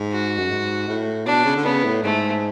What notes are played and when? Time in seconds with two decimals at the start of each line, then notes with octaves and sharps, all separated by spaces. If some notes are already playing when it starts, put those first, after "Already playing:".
Already playing: G#2
0.12 F#4
0.38 F#2
0.50 G#2
0.88 A2
1.26 B2 D4
1.45 C#3
1.56 D3
1.65 C#3 B3
1.85 A2
2.03 G#2 A3